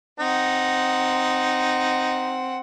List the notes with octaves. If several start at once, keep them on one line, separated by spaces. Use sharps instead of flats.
C4 D#4 F#5